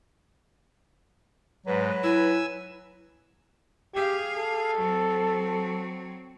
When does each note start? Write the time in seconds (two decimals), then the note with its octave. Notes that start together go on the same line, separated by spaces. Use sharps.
1.66 G#2 F#3 B4
2.03 E4 G#5 E6
3.95 G4 G#4 F5
4.36 A4
4.77 F#3 C4